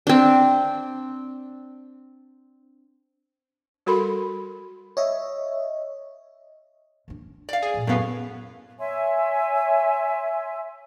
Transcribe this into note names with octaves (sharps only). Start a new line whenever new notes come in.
C4 D4
G3 F#4 A4 A#4 B5 C6
C#5 D#5 E5
G#3 D4
C#4
D5 F5
G#4
G2 A#2
F#2 A2 B3 F5
C#5 E5 G#5 C6